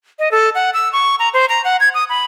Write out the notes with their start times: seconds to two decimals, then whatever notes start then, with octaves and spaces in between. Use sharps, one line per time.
0.19 D#5
0.32 A4
0.55 F#5
0.74 E6
0.93 C#6
1.19 A#5
1.34 C5
1.49 A#5
1.64 F#5
1.80 G#6
1.94 D#6
2.09 B5